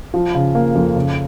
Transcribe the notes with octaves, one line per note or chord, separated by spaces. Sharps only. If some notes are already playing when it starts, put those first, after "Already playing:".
F3
C#3
A#3
F2
C#3